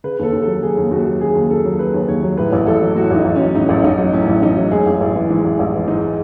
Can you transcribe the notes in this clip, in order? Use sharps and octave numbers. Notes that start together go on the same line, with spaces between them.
C#3 B4
D#2 A4
D#2
F#3 A4
C#3 G#4
D#2
D#2 F#4
F#3
C#3 G#4
D#2
D#2 A4
F#3
C#3 B4
D#2
D#2 C#5
F#3
A2 B4
A1
A1 A4
F#3
A2 F#4
A1 D#4
A1
F#3 C#4
A2 D#4
A1
A1 D#4
F#3
A2 C#4
A1
A1 D#4
F#3
G#2 G#4
A1
A1
E3
G#2
A1
A1
E3
G#2 D#4